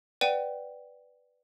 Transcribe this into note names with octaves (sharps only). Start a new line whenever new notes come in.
B4 D5 F#5 G5 D#7